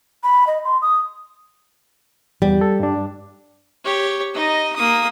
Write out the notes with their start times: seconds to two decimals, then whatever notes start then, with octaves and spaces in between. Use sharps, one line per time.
0.23 B5
0.47 D#5
0.65 C6
0.82 D#6
2.42 E2 G3
2.61 A4
2.80 G2 D4
3.85 G4 C#5
4.34 D#4 D#5
4.76 A#3 D#6